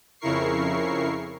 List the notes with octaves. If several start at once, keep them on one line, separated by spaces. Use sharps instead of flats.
F2 C#3 E4 A#4 C#6 C7